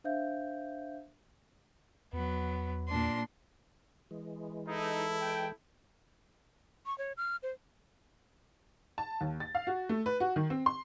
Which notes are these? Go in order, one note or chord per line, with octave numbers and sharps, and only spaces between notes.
D4 C5 E5 F5 G6
E2 F#3 B3
A#2 D4 C6
E3 G#3
D#4 E4 A4
G5
C#6
C#5
F6
C5
A5
D#2
A6
F5
F#4
A3
B4
F#4
D#3
C4
C6